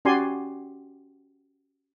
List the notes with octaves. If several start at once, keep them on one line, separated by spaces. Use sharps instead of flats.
C#4 F#4 G4 D5 G#5 C6